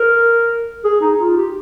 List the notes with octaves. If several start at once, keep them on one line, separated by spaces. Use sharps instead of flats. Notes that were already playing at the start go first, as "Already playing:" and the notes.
Already playing: A#4
G#4
D#4
F4
G4